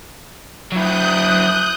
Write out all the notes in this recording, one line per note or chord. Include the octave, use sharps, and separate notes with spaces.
F#3 E4 D#6 F#6 G6